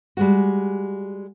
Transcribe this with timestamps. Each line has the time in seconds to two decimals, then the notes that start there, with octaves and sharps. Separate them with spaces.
0.17 G3 G#3 F#4